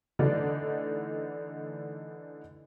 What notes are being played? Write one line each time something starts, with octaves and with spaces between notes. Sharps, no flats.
D3 E3 A3 D4 D#4 D5